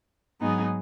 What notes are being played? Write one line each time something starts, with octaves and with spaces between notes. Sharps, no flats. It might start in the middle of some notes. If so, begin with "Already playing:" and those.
G#2 F#3 B3 D#4 G#4